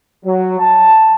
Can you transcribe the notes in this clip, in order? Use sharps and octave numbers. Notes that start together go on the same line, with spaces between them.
F#3
A5